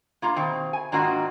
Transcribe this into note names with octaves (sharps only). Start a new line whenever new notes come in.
A#3 F4 A#5
B2 D#3 C4
G#5
G#2 D#3 A#3 D4 F4 F#4